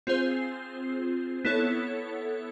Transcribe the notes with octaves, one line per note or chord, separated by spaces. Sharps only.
C4 F4 G#4 C5
B3 E4 A4 C#5